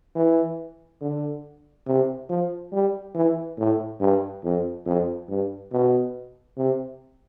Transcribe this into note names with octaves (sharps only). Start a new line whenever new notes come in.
E3
D3
C3
F3
G3
E3
A2
G2
F2
F2
G2
B2
C3